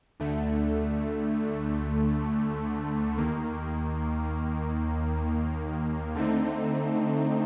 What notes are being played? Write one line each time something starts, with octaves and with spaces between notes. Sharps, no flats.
D2 D3 A3
D#2 D#3 A#3
D3 A3 C4 D#4